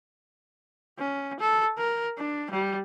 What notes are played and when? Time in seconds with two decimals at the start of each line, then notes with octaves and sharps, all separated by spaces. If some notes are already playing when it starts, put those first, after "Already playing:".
0.98 C#4
1.40 A4
1.78 A#4
2.18 D4
2.50 G3